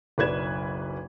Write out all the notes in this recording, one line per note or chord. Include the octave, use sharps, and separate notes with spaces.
F#1 B1 B4 D5 G#6 E7